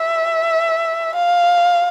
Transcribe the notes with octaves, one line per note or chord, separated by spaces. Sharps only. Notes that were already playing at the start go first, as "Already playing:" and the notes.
Already playing: E5
F5